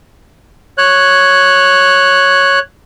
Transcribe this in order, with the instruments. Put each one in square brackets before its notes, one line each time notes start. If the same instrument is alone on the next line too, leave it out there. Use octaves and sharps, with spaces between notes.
[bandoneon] C#5 F#6